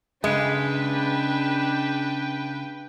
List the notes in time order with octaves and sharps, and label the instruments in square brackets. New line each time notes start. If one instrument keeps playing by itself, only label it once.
[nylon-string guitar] C#3 [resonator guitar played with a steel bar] G#3 [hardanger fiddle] D4 [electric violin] B4 G5